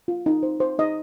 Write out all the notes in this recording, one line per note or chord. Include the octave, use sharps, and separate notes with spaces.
F4
D#4
C5
C5
D#4 D#5